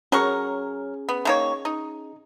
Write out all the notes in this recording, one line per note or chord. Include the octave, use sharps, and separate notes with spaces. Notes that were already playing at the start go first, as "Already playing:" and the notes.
F#3 C#4 G#4 A#4 C#6
B3
D#3 A#3 C#5
D#4